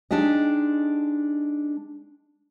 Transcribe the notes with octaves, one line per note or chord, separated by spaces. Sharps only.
G#3 D4 D#4 G4 D#5